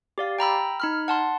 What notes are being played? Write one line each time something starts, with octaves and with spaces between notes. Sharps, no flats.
G4 D5 F5
G5 A#5 B5 E6
D#4 B5 F6
F#5 A5 C6